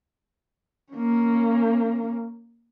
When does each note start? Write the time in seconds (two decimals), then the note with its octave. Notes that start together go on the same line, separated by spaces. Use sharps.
0.93 A#3 C#4